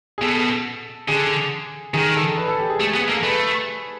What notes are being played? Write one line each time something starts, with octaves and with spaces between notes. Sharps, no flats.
G#4
B2 A4
D3 G#4
D#3 G#4
A4
B4
A4
G4
G#4
A3 G#4
B3 G#4
A#3 A4
A3 B4